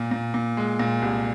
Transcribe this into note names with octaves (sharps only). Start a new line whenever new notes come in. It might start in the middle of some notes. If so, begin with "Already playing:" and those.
Already playing: A#2
A#2
A#2
G#3
A#2
C2